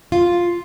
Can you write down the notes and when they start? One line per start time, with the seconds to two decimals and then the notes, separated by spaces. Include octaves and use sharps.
0.12 F4